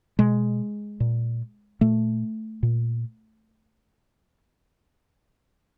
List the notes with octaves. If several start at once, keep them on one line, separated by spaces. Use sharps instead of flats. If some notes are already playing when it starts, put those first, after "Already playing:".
B2 G#3
A#2
A#2 A3
A#2